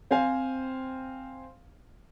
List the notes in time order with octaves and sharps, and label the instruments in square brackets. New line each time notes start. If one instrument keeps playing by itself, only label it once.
[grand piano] C4 C5 F5 G#5